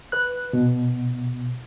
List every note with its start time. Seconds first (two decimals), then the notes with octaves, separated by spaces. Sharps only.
0.12 B4 F#6
0.53 B2